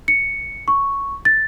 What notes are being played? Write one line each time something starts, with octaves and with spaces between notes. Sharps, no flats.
C#7
C#6
A6